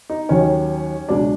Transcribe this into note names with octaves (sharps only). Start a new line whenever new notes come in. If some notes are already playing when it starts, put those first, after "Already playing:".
D#4
D#2 D#3 F#3 C#4
C#2 B2 F#3 D4